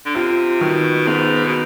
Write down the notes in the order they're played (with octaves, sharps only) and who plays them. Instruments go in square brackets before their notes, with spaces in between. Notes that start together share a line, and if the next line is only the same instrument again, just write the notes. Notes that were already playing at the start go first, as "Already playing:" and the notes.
[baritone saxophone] D3
[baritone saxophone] C3 [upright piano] F4
[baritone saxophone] B2 [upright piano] D#3
[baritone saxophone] G#2 [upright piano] B3
[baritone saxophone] B2